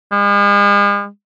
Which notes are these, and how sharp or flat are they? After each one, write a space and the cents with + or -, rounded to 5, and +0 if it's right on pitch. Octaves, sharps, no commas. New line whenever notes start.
G#3 -45